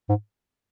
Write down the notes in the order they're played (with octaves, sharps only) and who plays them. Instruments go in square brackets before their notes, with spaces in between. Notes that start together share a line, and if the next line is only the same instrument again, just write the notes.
[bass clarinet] G#2